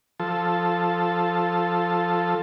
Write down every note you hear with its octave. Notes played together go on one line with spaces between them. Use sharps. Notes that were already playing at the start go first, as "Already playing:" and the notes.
F3 A4